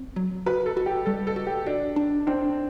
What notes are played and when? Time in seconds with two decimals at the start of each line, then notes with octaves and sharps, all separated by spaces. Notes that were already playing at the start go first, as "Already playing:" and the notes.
Already playing: C4
0.16 F#3
0.46 F#4 B4
0.66 A4
0.77 F#4
0.86 G4
1.06 G3 A4
1.27 A4
1.36 F#4
1.47 G4
1.66 D4 F#4
1.96 D4
2.27 C4 D4